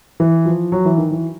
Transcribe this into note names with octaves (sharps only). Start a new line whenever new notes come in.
E3
F3
F#3
E3
D#3
E3